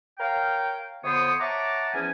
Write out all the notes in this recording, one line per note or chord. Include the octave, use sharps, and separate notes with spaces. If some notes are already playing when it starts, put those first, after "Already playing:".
A#4 C#5 F5 G5
F2 D3 B3 C5 C#5 D#6
C#5 E5 F#5 A5 A#5 D6
E2 F3 C#4 G#5